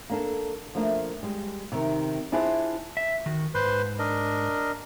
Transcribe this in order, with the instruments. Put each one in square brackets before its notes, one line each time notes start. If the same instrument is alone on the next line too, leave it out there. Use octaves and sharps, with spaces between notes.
[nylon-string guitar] A#3 D4 A4
F3 A3 A#3 D4
G3 G#3
C3 D#3
D4 E4 F4 G#4 B4 C5
[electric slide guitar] E5
D#3 F#4
[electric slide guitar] G#2 [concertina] B4 C5 C6
[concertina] D4 A#4 D#5